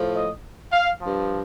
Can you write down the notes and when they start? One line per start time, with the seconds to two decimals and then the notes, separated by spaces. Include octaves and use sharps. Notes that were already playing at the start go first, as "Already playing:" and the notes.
Already playing: A2 F3
0.16 D#5
0.73 F5
1.01 G2 F3